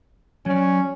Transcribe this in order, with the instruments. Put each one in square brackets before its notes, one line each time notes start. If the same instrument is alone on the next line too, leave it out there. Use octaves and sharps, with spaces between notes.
[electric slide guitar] F#3 D5 [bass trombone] C#4